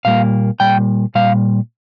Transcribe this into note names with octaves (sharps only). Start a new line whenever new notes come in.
A#2 G3 A#3 F5
A#2 G3 G5
A#2 G3 F5